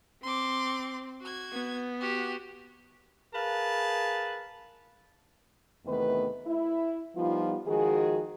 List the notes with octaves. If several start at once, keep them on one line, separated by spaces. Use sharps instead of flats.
C4 C6 D6
F#4 G#6
B3
F#4 G4
G#4 A#4 B4 F5 A5
E2 C3 D#3 A3 B3 B4
E4
F3 G3 B3 D#4 F4
D#3 F3 G#3 F#4 G#4